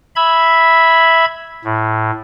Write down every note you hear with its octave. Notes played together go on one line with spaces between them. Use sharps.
E5 B5 G#6
A2